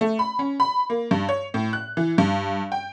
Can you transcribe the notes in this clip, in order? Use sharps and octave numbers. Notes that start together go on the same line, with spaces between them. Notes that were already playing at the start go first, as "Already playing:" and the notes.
A3
B5
C#4
B5
A#3
G2
C#5
A2
F#6
E3
G2
G5